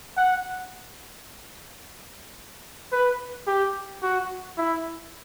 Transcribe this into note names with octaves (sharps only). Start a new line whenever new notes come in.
F#5
B4
G4
F#4
E4